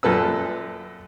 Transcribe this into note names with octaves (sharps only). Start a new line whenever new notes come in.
F#2 A#2 A4 B4 E6